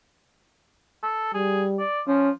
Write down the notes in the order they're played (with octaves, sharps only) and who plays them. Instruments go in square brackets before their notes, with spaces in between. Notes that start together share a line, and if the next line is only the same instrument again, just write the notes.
[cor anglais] A4
[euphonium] G3 [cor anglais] G#4
[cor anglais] D5
[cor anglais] F3 [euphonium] C#4